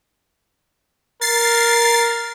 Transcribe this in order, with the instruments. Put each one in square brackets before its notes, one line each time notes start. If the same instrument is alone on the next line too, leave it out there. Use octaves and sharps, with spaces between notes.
[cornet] A#4 [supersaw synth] A6 C7